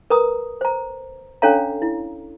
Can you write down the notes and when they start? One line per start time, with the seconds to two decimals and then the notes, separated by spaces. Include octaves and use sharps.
0.10 A#4 B4 A#5 D#6
0.61 C5 A#5
1.42 C#4 D4 A4 C#5 F5 A#5
1.82 E4